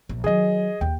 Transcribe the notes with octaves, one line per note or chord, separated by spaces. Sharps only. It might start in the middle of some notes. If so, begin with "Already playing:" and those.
A#1
D#3 F#3 G#4 D#5
D#2 G5